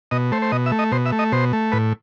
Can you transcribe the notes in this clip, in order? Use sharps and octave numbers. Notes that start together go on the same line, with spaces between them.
B2 D#5
A3 C5
C5
B2 D#5
E5
A3
D#5
B2 C5
E5
A3
D#5
B2 C5
A3
A2 B4